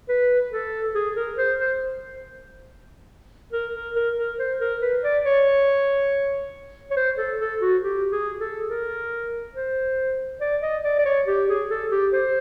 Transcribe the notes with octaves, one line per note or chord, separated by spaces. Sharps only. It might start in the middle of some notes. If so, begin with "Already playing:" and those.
B4
A4
G#4
A#4
C5
C5
A#4
A#4
A#4
A#4
C5
A#4
B4
D5
C#5
C#5
C5
A4
A4
F#4
G4
G#4
A4
A#4
C5
D5
D#5
D5
D5
C#5
G4
G#4
A4
G4
C5